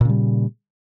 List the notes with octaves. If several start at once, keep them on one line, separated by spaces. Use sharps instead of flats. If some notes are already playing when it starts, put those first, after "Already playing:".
A#2 C#3 G3